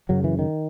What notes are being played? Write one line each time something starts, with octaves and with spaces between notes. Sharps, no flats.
F#2 C#3 F#3
E3
D#3